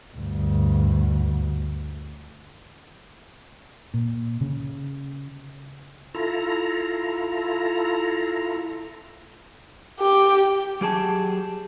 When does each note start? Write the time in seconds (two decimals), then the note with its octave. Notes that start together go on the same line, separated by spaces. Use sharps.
0.17 D2 G2
3.94 A#2
4.41 C#3
6.15 E4 F4 A4 A#5
10.00 G4
10.81 F#3 G4 G#4 A5